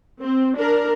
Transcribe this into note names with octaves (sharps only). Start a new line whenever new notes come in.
C4
D4 A#4